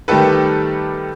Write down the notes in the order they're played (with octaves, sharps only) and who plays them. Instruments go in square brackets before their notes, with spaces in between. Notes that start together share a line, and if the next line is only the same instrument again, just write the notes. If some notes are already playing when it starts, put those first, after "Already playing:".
[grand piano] D#3 G3 A3 G4 A4 B4